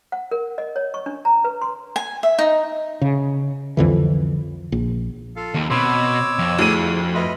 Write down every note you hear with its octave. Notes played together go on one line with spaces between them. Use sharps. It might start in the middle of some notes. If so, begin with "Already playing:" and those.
F#5
A#4
D#5
C#5
C#6
D4
A#5
B4
C6
G#5
E5
D#4
C#3
C2 F2 D3 E3
A#1
F4 A4 F5
D#2 D#3
B2 C4 C#5 B5 C6 D6 E6
F2
D2 E4 G#4 D#7
B4 D#5 E5 B5 C6